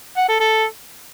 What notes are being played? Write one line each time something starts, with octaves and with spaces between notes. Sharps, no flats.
F#5
A4
A4